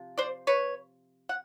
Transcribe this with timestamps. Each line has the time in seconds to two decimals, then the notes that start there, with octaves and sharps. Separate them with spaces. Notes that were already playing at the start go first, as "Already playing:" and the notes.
Already playing: C3 F3
0.18 C5 D5
0.47 B4 C#5
1.29 F#5